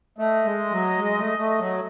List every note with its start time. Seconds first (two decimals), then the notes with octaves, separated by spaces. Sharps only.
0.18 A3 D#5
0.45 G#3
0.72 F#3
0.99 G#3
1.19 A3
1.39 A3
1.59 F#3